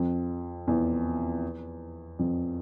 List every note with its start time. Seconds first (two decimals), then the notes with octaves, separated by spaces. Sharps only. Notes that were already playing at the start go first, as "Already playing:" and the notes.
Already playing: F2
0.67 E2
2.19 F2